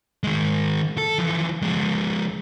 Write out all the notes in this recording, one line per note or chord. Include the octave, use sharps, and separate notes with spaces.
D#3 G#3
A4
E3 F3
F3 G#3